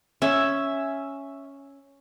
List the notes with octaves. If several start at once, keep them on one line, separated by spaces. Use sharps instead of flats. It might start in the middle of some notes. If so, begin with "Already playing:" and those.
C#4 E5 G#5